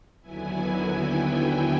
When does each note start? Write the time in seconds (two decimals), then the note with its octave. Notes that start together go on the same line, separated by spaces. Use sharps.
0.21 D#2 D3 F#3 B3 E4 G#5
0.97 G5